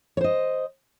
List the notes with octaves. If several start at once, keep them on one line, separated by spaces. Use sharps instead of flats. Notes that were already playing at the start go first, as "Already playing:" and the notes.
C5 C#5 D#5